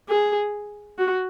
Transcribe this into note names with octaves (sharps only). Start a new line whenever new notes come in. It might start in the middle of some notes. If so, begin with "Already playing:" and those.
G#4
F#4